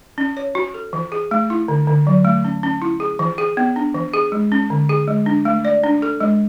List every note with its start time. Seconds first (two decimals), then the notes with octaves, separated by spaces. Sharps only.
0.18 C#4
0.37 C#5
0.55 F#4
0.74 A4
0.93 E3
1.12 G#4
1.31 A3
1.50 E4
1.68 D3
1.87 D3
2.07 F#3
2.25 A3
2.45 C#4
2.63 C#4
2.82 E4
3.00 G#4
3.19 E3
3.38 G#4
3.57 B3
3.76 D4
3.95 E3
4.14 G#4
4.32 G#3
4.52 C#4
4.70 D3
4.89 G#4
5.08 G#3
5.26 D4
5.45 A3
5.65 D5
5.84 D4
6.02 A4
6.20 G#3